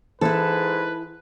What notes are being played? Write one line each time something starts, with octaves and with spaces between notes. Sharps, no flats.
G#2 E3 E4 A4 B4